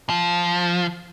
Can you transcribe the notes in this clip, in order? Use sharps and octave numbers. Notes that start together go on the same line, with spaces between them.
F3